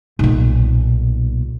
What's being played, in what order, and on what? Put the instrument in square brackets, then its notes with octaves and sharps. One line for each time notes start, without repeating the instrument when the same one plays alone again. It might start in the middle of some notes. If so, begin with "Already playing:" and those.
[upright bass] B1 A#2